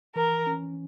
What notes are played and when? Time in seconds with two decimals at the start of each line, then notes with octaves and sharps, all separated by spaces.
0.16 E3 A#4
0.47 C#4